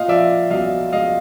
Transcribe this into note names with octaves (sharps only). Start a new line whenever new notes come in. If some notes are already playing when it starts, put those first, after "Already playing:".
Already playing: A#2 D#5 F5
F3 D5 E5
B1 D#5 F5
G#3 D#5 F5